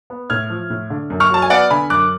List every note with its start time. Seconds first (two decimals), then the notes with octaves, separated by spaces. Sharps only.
0.10 B3
0.30 A2 F6 G#6
0.50 F3
0.70 A2
0.90 D3
1.10 F#2
1.20 C#6 F6
1.30 F#3 A5
1.42 G#5
1.50 B3 D5 F#5
1.70 D3 G#5 B5
1.90 F#2 D6 F#6